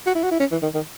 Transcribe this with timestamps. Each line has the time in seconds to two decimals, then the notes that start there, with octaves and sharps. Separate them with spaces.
0.06 F#4
0.15 E4
0.23 F#4
0.31 E4
0.40 C#4
0.52 E3
0.62 D#3
0.74 D#3